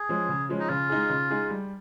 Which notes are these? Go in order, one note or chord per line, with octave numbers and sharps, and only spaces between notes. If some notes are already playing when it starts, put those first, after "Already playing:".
Already playing: G#4
F3 G#3 C#4
C#3
F3 G#3 C#4
D#4
C#3 F4
G#3 D#4 G#4
C#3
G#3 D#4 G#4
G3